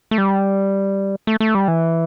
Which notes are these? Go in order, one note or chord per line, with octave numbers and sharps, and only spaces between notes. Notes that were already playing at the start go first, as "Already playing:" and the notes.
A3
G3
A3
A3
G3
E3